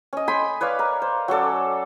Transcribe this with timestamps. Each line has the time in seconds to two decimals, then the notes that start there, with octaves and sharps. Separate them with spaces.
0.13 C#4 D#5
0.28 G5 G#5 B5 C6
0.61 B4 C#5 D5 F5
0.79 A#4
1.02 C5
1.28 F#3 C#4 A4 D5